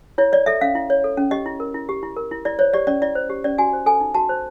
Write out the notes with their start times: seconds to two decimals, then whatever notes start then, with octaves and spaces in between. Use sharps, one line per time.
0.18 E4 C#5
0.33 C#5 D5
0.46 A4 E5
0.61 C#4 F5
0.75 E4
0.90 C#5
1.04 A4
1.17 C#4
1.31 G4 D#5
1.46 E4
1.60 A#4
1.74 E4
1.89 G4
2.03 E4
2.17 A#4
2.31 E4
2.45 E4 D5
2.59 C5 C#5
2.74 G4 D5
2.87 C#4 D5
3.02 E4 D5
3.15 C5
3.30 G4
3.44 C#4 D5
3.58 F#4 G#5
3.73 C5
3.86 A4 G#5
4.01 D#4
4.14 F#4 A5
4.29 C5